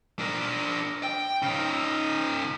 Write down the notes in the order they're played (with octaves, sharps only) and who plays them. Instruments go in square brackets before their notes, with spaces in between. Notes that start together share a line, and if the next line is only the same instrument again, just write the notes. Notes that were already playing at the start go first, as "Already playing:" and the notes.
[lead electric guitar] D4 A#4
G5
C#3 D#4